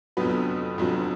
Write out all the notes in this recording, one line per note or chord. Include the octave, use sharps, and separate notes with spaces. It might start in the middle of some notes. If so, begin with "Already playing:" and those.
F1 F2 D3 F#3 B3 B4
F1 F2 D3 F#3